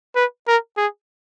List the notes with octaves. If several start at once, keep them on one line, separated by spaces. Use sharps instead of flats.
B4
A#4
G#4